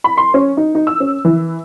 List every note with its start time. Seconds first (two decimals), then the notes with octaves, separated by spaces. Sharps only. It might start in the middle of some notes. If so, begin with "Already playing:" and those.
0.04 B5
0.17 C6
0.34 C#4
0.57 D#4
0.75 D#4
0.87 E6
1.00 C#4
1.25 E3